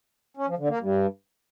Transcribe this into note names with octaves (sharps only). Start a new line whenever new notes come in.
C#4
F3
D3
A#3
G2